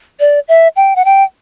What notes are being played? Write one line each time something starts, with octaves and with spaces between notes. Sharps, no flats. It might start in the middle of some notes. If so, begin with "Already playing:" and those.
D5
E5
G5
F#5
G5